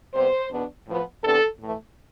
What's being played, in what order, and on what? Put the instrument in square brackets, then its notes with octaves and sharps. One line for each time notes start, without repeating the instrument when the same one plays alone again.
[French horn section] C3 G3 B3 C5
E2 B2 B3 D4
A2 F3 B3
C3 E3 B3 D4 A4
A2 E3 A3